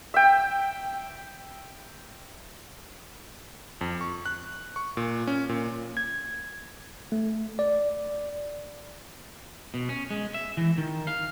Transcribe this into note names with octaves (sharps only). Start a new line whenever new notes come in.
E5 G5
F2
C#6
F#6
C#6
A#2
C#4
A#2
G#6
A3
D5
B2
C#4
G#3
E5
E3
D#3
F5